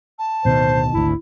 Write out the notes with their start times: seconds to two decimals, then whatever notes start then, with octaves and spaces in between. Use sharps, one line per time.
0.19 A5
0.45 D1 B2 D#3 C5
0.93 G#1 D2 E4